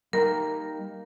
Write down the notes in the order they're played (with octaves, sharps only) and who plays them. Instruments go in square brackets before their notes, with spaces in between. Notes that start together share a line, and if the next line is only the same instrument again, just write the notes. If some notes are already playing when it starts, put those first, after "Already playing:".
[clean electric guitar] G3 A#3 D#4 [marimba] A#4